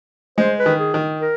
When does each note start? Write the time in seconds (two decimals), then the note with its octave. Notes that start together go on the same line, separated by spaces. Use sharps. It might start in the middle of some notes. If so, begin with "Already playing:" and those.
0.38 G#3 C5
0.59 B4
0.66 D#3
0.80 G#4
0.94 D#3
1.22 A#4